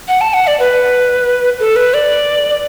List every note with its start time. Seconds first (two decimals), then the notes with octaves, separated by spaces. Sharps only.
0.08 F#5
0.21 A5
0.34 F#5
0.47 D5
0.60 B4
1.60 A4
1.76 B4
1.94 D5